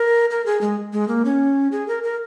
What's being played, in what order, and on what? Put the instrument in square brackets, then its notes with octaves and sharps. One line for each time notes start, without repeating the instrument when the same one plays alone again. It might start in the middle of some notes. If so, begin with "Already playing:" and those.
Already playing: [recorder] A#4
A#4
G#4
G#3
G#3
A#3
C#4
G#4
A#4
A#4